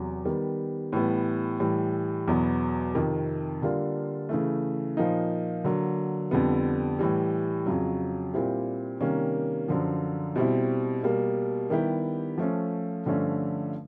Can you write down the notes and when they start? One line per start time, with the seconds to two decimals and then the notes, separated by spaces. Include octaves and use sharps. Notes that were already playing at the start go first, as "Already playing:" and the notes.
Already playing: E2 C3 F#3
0.25 D#3 G3 B3
0.93 A2 E3 G3 B3
1.60 A2 E3 G3
2.28 E2 B2 F#3 B3
2.95 F2 C3 D#3
3.62 D3 G3 A#3 D4 F4
4.29 C#3 E3 A3
4.97 A#2 F3 A#3 D#4
5.64 D3 F#3 A#3
6.31 F2 D3 G3 B3
6.99 A2 E3 G3
7.66 F2 C#3 F#3
8.33 A#2 G3 C4 E4 G4
9.01 C3 D#3 G3 A#3 C#4
9.69 F#2 D3 F3
10.36 B2 G3 C4 E4
11.03 B2 G3 A#3
11.70 D#3 G3 B3 E4 G4
12.38 F3 A3 C#4
13.05 G2 D3 F3 A3 C#4